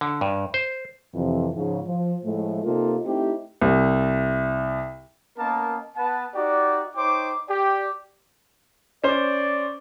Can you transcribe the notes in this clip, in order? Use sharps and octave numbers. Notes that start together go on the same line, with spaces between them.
D3
G2
C5
F2 C3 E3
G#2 C#3 F3
F3
A2 F3 G#3 A3
C3 A#3 C4 D#4 F4 A4
A3 C4 D#4 E4 G4
C2
A#3 B3 C#4 A#4 D#5 A5
B3 B4 F#5 A5
D#4 F#4 G4 D5
D#4 C5 C#5 G5 D6
G4 D5 D6
C#4 C5 D5